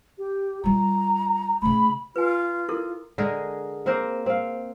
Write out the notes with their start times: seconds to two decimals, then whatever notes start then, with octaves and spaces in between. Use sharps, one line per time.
0.18 G4
0.64 G3 F4 A#5
1.62 C#3 A3 B5
2.16 F4 B4 G#5
2.69 E4 A4 A#4
3.18 D3 G#3 G#4 A#4
3.86 A#3 C4 A#4 C5
4.26 C4 F5